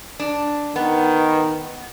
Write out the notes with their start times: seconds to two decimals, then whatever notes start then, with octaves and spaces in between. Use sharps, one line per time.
0.20 D4
0.76 D#3 B3